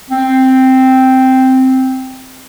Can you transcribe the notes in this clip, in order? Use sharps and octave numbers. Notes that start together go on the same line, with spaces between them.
C4